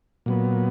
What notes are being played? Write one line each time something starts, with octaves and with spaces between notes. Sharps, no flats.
A#2 F#3 B3